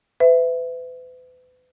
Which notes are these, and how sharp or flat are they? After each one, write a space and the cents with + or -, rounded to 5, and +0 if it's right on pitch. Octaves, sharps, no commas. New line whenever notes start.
B4 +40 E5 +5